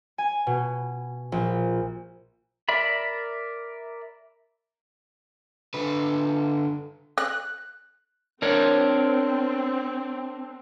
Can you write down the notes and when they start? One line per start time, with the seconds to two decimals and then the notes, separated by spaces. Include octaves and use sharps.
0.18 G#5
0.47 B2
1.32 A#1
2.69 A#4 D5 E5 B5
5.74 D3 B4
7.18 F#6
8.42 C4 D4 A#4 C#5